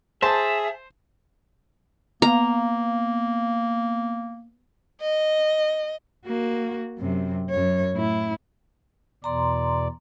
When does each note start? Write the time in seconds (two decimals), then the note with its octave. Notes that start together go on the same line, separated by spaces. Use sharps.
0.22 G#4 C5 E5 A5
2.22 A#3 B3 F5 A#5
5.01 D#5
6.26 A#3 F#4
6.99 F#2 C3
7.50 F#2 C#5
7.94 A2 E4
9.24 E2 B2 D5 A#5 C6